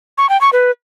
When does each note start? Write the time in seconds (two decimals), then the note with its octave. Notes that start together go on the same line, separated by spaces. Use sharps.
0.18 C#6
0.29 G5
0.41 C#6
0.53 B4